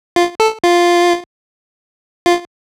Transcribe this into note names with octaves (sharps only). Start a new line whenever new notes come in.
F4
A4
F4
F4